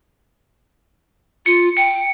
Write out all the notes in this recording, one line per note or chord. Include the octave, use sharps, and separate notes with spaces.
F4 C#7
G5 C#7